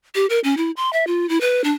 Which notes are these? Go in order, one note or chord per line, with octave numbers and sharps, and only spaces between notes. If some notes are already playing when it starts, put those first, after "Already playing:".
G4
A#4
C#4
E4
C6
E5
F4
E4
B4
D4